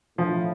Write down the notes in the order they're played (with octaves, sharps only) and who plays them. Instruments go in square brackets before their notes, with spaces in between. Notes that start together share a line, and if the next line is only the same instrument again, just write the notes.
[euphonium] A2 [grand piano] F3